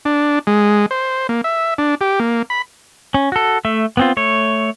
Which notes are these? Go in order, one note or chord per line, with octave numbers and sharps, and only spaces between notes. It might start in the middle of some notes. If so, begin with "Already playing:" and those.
D4
G#3
C5
A#3
E5
D4
G4
A#3
B5
C#4
F#4 A4
A3 E5
B3 C4 F4
A3 C#5